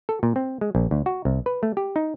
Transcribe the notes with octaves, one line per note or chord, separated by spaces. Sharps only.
A4
A#2
C4
G#3
A#1
D2
F#4
C2
B4
A3
G4
D#4